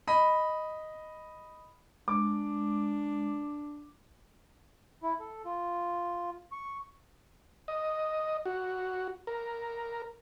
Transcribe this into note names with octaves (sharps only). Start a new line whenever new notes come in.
D#5 B5
G#3 D4 D6
E4
A4
F4
C#6
D#5
F#4
A#4